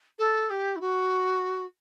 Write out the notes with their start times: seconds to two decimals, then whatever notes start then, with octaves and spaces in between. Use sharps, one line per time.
0.18 A4
0.50 G4
0.76 E4
0.80 F#4